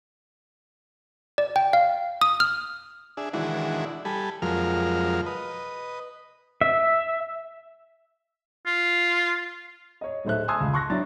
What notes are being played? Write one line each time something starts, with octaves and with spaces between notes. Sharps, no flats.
D5
G5
F5
D#6
F6
D4 G#4 E5
D#3 E3 G#3 D4 E4 F#4
G3 A4 G#5 B5
F2 F3 F#3 G#3 A#4 F6
B4 D#5
E5
F4
C#5 D#5
D1 A3 D#4 C5 E5 F#6
G#5 A5 C6 D#6 E6 G#6
C#2
A5 C6 C#6 F#6 A#6
F#3 D4 E4 A6